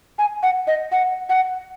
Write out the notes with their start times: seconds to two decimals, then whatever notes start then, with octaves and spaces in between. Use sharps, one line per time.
0.19 G#5
0.43 F#5
0.67 D#5
0.92 F#5
1.29 F#5